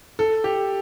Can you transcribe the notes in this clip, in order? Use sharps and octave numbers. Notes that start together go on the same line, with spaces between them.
A4
G4